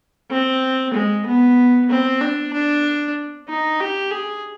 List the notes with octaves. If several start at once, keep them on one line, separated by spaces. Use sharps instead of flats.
C4
G#3
B3
C4
D4
D4
D#4
G4
G#4